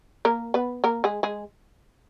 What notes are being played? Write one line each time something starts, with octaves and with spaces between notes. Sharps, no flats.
A#3 A#4
B3 B4
A#3 A#4
G#3 G#4
G#3 G#4